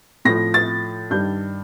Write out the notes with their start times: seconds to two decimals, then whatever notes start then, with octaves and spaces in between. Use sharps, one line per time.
0.25 A2 F3 A#6
0.54 A6
1.10 G2 D#3 G3 G6